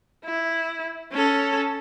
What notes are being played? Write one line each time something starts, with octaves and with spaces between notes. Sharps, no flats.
E4
C#4 A4